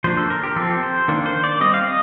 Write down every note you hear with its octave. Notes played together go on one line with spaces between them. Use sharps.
F3 A#3 D4 C5
A4
A#4
G4
F3 C4 A4
C5
D#3 A#3 D4
C5
D5
G3 C4 D#5
F5
D#5